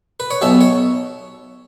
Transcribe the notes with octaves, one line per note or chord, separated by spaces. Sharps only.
B4
C#5
B1 B2 E5
C#5